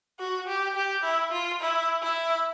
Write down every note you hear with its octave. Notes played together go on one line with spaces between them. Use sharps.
F#4
G4
G4
E4
F4
E4
E4